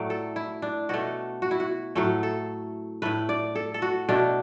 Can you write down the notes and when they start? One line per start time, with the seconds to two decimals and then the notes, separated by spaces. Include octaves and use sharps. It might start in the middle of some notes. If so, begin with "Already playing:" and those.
Already playing: A2 F#3 A3 D5
0.10 A4
0.36 E4
0.62 D4
0.89 B2 A3 F#4
1.42 F#4
1.51 E4
1.60 F#4
1.95 A2 F#3 A3 A4
2.23 A4
3.02 A2 A3 B4
3.29 D5
3.55 A4
3.74 A4
3.82 F#4
4.09 B2 A3 D4